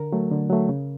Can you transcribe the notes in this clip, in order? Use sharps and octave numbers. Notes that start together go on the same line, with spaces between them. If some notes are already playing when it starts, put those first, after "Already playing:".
Already playing: D3 A#4
F#3 A3
D3
F#3 A3
C#3